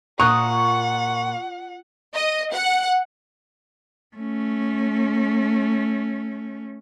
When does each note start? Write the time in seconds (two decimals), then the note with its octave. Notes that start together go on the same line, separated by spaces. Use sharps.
0.20 A#2 F#5 A#5 C#6 D#6 F#6
2.14 D#5
2.53 F#5
4.16 A3 C#4